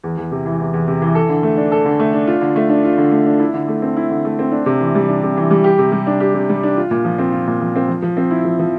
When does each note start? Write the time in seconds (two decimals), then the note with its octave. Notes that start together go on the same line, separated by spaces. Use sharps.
0.04 E2
0.17 E2
0.32 C3
0.46 E3
0.60 E2
0.73 E2
0.88 C3
1.02 E3
1.15 A4
1.29 D3
1.43 A3
1.57 D4
1.72 A4
1.85 D3
1.99 A3
2.13 D4
2.27 F4
2.41 D3
2.56 A3
2.70 D4
2.85 F4
2.98 D3
3.11 A3
3.25 D4
3.39 E4
3.53 D3
3.68 A3
3.82 C4
3.97 E4
4.10 D3
4.25 A3
4.39 C4
4.52 D4
4.66 C3
4.81 E3
4.95 G3
5.08 D4
5.23 C3
5.37 E3
5.51 G3
5.64 G4
5.79 C3
5.92 G3
6.07 D4
6.20 G4
6.34 C3
6.49 G3
6.63 D4
6.77 F4
6.91 A#2
7.05 F3
7.18 C4
7.33 F4
7.47 A#2
7.61 F3
7.76 C4
7.89 F3
8.02 F3
8.17 C4
8.31 E4
8.45 F3
8.59 F3